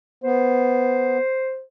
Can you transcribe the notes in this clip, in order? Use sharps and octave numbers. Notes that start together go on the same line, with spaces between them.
B3 C5